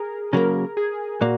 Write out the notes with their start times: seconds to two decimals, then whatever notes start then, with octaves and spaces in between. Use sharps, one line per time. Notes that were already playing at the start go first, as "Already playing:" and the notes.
Already playing: G#4 A#4
0.32 C#3 F#3 A#3 A#4
0.77 G#4
1.21 A#2 A#3 F#4